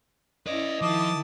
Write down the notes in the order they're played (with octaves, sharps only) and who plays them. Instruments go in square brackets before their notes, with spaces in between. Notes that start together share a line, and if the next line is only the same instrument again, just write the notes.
[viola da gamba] C#4 E4 [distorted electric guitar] B4 D5 [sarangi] D#5
[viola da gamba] D#3 E4 [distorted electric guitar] F3 [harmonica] A5 D6 D#6